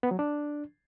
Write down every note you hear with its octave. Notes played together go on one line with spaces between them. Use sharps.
B3
F#3
D4